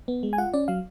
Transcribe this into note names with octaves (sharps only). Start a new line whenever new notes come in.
B3
G#3
G#5
F4 F#5
C#4 D5
F#3 F5